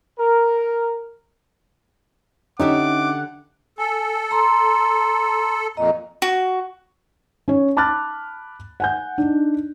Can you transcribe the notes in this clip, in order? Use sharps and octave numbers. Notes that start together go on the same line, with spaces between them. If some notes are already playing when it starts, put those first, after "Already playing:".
A#4
D3 C#4 D#4 G4 E5 F#5 D6
A4 G#5
A#5 C6
F2 A#2 D#5 A#5
F#4
C#4 C#5
A5 B5 D6 F6 F#6 A6
F#5 G#5 G6
D4 D#4